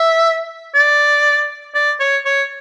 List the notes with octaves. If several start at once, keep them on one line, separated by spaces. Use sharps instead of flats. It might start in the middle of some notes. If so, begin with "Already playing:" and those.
Already playing: E5
D5
D5
C#5
C#5